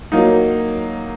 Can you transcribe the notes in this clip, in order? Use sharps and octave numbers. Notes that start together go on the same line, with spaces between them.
F#3 A#3 D#4